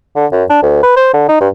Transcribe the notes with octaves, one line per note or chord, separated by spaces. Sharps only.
D3
F#2
D4
D2
B4
C5
D3
D#4
G2